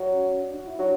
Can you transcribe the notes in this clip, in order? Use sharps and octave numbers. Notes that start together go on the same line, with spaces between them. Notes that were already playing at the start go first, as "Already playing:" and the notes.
Already playing: F#3
C#4
C#4
D4
F#4
E4
F#3 D4